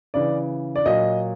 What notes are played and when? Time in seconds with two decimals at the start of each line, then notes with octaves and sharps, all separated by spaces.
0.14 C#3 E3 D5
0.76 D5
0.86 A#2 F#3 D#5